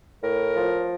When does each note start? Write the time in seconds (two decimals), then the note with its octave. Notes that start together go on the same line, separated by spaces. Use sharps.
0.23 A2 A#4
0.56 F3